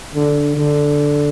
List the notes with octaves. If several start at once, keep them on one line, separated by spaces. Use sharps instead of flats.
D3
D3